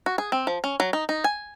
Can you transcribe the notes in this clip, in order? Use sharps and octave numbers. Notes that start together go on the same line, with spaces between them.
F#4
G#4
C4
F3
C#4
F#3
D#4
D#4
G#5